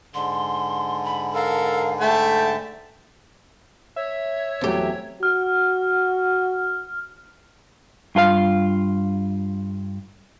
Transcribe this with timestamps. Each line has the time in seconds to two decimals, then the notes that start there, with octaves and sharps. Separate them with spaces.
0.14 G#2 D3 C6
1.05 B5
1.34 A4 A#4 F5
2.00 A3 E5 G5 A5
3.96 C#5 E5
4.61 E2 F#3 A3 C4 G4
5.23 F#4 F6
8.15 G2 F4 A#4 F5